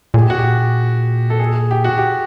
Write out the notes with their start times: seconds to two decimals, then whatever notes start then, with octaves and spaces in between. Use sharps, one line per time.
0.14 A#2 G#4
0.22 G4
0.30 F#4
0.38 G4
1.30 A4
1.39 G#4
1.71 G4
1.84 F#4
1.98 G4